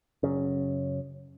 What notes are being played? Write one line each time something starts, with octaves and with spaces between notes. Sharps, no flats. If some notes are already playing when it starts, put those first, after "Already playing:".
F#2 C#3